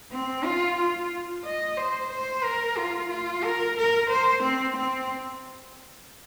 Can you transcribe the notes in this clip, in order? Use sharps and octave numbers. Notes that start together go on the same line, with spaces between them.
C4
F4
F4
D#5
C5
C5
A#4
F4
F4
A#4
A#4
C5
C4
C4